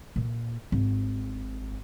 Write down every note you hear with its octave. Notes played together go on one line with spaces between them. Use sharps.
A#2
G#1